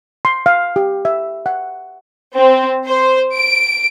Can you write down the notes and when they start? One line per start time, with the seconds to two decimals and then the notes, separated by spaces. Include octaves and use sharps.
0.25 C6
0.46 F5
0.76 G4
1.05 E5
1.46 F#5
2.34 C4
2.87 C5
3.34 D7